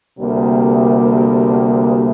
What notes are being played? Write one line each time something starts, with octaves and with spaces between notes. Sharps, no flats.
D2 C3 G3 A#3